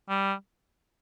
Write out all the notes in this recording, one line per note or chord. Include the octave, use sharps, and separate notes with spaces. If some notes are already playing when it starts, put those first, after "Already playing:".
G3